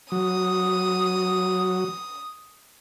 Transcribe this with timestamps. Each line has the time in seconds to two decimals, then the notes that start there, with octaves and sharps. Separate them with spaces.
0.12 F#3 D#6